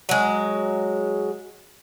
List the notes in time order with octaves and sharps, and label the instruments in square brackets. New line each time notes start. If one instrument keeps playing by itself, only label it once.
[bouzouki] F#3 G#3